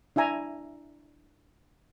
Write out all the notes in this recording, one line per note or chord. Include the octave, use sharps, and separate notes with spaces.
D4 E4 E5 G#5 A#5